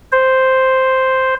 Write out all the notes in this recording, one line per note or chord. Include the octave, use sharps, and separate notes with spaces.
C5